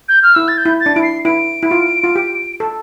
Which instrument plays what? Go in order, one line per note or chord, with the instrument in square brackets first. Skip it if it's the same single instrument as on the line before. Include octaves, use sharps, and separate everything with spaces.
[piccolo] G6
F6
[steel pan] E4 [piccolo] E6
[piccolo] A6
G6
[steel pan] E4
[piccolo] A6
[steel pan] D4
[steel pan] E4 [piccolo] D7
[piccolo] C7
[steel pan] E4 [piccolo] D7
[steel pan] E4
F4
F4
G4
A4